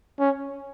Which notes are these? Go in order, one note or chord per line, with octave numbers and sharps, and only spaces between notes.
C#4